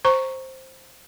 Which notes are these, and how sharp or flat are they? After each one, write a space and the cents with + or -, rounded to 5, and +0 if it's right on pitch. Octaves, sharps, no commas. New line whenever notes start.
C5 +5 A#5 +0 C#6 +0